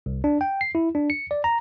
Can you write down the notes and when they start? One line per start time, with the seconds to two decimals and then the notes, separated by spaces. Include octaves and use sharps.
0.06 C2
0.24 D4
0.41 G5
0.61 C7
0.75 E4
0.95 D4
1.10 C#7
1.31 D5
1.44 A#5